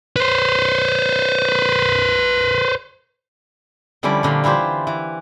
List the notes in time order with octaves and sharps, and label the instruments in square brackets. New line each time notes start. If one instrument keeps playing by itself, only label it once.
[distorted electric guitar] B4 C5
[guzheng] D3 F3 G3 C#4 E4 D5
A#2 D3 F5
E3 E4 F4 G4 C5
E3